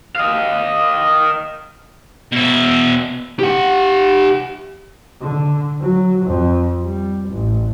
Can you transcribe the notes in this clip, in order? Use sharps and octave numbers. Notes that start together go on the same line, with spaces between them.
D#5 F5
B2 E5
G4 F#5
D3
F#3
F2
G3
A1